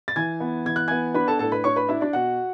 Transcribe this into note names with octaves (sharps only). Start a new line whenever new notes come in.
A6
E3 G#5 G#6
B3
E3 G#6
F#6
B3 G#5 G#6
D4 B4 B5
A4 A5
A2 A4 A5
B4 B5
D4 C#5 C#6
B4 B5
D4 E4 E5
D4 D5
B2 F#4 F#5